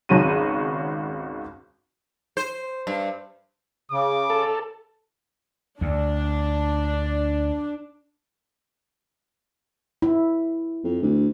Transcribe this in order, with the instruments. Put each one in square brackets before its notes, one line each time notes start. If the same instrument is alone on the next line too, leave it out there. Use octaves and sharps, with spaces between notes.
[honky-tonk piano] G#1 C#2 F#4 C#5 D#7
[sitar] C5
G2
[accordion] C#3 [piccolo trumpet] D6
[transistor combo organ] A4
[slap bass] D2 [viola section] D4
[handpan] E4
[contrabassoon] F2
D2